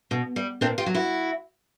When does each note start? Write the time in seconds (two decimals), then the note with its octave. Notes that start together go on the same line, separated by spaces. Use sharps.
0.11 B2
0.36 G3
0.61 A#2 C4 D4
0.78 F4 G4
0.86 F#3
0.94 E4 F#4